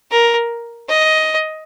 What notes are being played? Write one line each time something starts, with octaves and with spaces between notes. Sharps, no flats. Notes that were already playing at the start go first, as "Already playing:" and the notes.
A#4
D#5